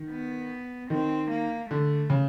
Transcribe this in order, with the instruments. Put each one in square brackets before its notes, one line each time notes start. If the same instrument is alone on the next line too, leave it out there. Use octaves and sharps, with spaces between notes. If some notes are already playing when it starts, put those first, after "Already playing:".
Already playing: [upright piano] D#3
[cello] B3
[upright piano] D#3 [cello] C4
[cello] A#3
[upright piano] D3 [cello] A3
[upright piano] C#3